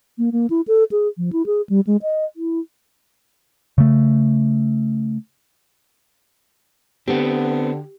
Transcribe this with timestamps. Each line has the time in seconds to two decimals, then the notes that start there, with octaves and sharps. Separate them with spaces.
0.18 A#3
0.32 A#3
0.50 E4
0.68 A4
0.92 G#4
1.18 F3
1.33 E4
1.46 G#4
1.69 G3
1.87 G#3
2.02 D#5
2.36 E4
3.78 C#3 A3
7.08 D3 B3 C4 G4